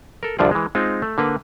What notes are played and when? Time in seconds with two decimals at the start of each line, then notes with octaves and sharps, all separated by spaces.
0.23 A4 A#4
0.39 C2 G2 D3 F3 F4 D5
0.51 E3 G#3
0.75 G#3 C4 D#4 F4
1.02 A3
1.18 D3 A#3 B4